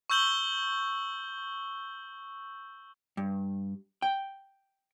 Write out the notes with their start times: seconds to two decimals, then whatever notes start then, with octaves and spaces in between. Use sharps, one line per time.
0.10 C#6 E6 G6 F#7 G7
3.17 G2
4.02 G5